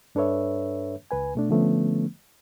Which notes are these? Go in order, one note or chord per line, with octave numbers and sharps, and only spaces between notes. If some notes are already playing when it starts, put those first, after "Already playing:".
G2 D4 A4 B4 C#5 E5
C#2 B4 G#5
B2 A3 D4
D3 F3 A3 B3 C#4